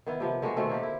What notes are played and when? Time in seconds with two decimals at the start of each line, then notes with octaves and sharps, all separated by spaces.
0.07 D#3 B3 E4
0.20 C3 F3 B3
0.42 D3 G#3 A#3 F#4
0.56 B2 D#3 A3 C4
0.70 D3 A#3 G4
0.83 E4